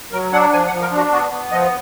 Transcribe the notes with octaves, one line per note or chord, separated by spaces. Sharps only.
F#3 A#4
D4 F#5
F3 G#5
F#5
F3
A#4
D4
F#4
B3 F#4
B3
F3 D#5